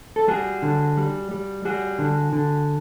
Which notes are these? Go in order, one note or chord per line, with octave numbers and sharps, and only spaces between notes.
A4
G3 F#4 G#4
D3
G3
G3
G3 F#4 G#4
D3
D3